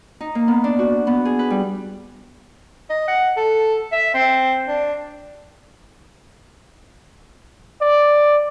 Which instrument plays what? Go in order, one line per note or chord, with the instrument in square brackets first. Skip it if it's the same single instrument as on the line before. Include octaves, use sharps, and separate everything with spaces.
[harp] D#4
A#3
B3
D4
F#4
B3
G#4
B4
G3
[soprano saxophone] D#5
F#5
A4
E5
C4
D4
[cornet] D5